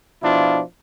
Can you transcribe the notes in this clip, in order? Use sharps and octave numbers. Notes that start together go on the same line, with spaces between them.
B2 F3 D4 E4 F4